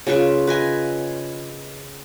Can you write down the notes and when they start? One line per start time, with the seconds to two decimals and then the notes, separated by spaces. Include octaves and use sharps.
0.07 C#3 F4 B4 C#6
0.47 B4 D#5 G#5